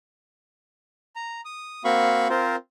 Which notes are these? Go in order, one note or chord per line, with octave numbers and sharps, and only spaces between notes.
A#5
D#6
A#3 C4 F#4 F5 B5 C#6
C4 F4 A#4 C5